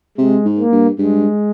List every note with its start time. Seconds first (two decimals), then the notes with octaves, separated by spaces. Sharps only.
0.18 C3 G#3
0.45 G#2
0.59 A#3
0.72 G2
0.98 G2 G#3